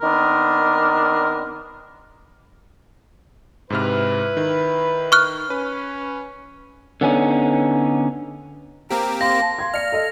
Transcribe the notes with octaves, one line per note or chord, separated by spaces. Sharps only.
D#3 B3 C4 D4 A#4
G#2 C3 E4 B4 F6
D#3
C#6 F6 F#6
C#4 B4
D3 B3 C#4 D#4
A#3 C4 G4 A#5
F5 C6 A#6
A5
F5 C6 G#6
D5 F6 C#7
A4 D#5